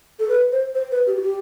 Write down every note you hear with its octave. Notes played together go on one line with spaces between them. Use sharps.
A4
B4
C5
C5
B4
G4
F#4
G4